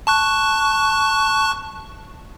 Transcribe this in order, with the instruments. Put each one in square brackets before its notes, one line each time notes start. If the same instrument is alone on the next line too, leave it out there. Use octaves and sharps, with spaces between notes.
[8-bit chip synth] A5 C#6 F#6